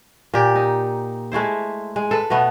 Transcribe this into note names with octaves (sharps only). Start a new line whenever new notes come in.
A#2 G4
D#4
G#3 A3 E4 C5
G#3
A4 B4
B2 A3 B3